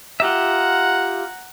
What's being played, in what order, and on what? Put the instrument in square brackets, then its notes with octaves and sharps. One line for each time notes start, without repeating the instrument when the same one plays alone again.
[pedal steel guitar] F4 G4 E5 [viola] F#5 A#5